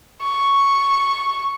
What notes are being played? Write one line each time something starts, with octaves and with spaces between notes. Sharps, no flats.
C#6